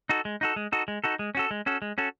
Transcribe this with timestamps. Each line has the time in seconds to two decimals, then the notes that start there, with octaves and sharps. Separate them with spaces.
0.09 D#4 F#4 A4
0.25 G#3
0.41 D#4 F#4 A4
0.56 G#3
0.72 D#4 F#4 A4
0.88 G#3
1.04 D#4 F#4 A4
1.19 G#3
1.35 C#4 F#4 A4
1.51 G#3
1.66 C#4 F#4 A4
1.82 G#3
1.98 C#4 F#4 A4